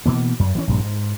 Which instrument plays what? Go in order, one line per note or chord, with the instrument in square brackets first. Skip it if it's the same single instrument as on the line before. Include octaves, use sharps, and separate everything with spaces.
[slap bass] B2 E3 A#3
F#2
E3 F#3 C#4
A#1 G2 A#2
G#2